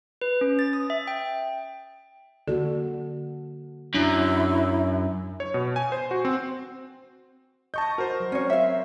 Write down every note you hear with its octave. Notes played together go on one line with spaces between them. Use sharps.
B4
C#4
A6
D#6
E5
G5
D3 A#3 F#4 A4
F#2 D4 E4
C#5
B2
G#5
C5
F#4
C4
D#5 A5 C#6 G6
F#4 A#4 C5
F#3
C4 C#4 C#5
E5 F5